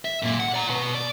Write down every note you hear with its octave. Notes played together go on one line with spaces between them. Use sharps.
E5
F#2 A#2
F#5
D5 A#5
B2 B4
D5